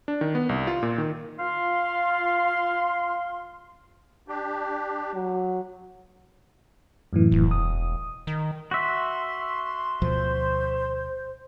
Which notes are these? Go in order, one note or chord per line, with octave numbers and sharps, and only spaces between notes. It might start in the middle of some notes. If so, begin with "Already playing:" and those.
D4
D#3
B3
C2
F4
A#2
D#3
F4 F5 C6
D4 G4
F#3
F#2 A2 E3
E1
D#6
D#3
F#4 E5 C6
D2 B2 F3 C5